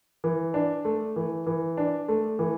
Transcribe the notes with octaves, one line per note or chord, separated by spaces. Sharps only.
E3
D4
A3
E3
E3
D4
A3
E3